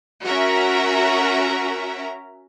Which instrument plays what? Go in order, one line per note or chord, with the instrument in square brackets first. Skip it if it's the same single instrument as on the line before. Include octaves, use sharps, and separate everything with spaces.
[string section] C#4 F#4 A#4 E5 A#5